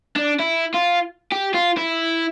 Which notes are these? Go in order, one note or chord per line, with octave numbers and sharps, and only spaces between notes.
D4
E4
F4
G4
F4
E4